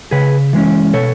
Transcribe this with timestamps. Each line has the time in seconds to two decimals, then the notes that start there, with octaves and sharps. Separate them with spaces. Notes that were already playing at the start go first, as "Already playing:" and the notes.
0.11 C#3 G#4 B4
0.53 E3 G#3 C#4
0.93 B2 A4 C#5